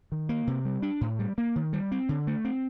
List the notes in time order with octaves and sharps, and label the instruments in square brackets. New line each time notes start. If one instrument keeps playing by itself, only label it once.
[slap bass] D#3
A#3
C3
G3
D4
A2
G3
A#3
D#3
G3
C4
D3
A3
C4